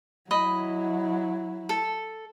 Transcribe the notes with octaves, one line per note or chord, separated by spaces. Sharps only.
F#3 E4 D#5 B5
A4